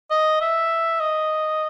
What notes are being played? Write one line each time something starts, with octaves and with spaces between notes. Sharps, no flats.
D#5
E5
D#5